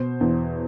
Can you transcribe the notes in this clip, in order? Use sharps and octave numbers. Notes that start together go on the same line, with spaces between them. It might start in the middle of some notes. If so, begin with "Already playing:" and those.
Already playing: B2 C5
E2